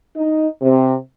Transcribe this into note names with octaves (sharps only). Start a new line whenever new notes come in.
D#4
C3